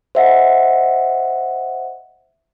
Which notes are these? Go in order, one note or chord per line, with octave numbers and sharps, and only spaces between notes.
C5 D#5 E5 F#5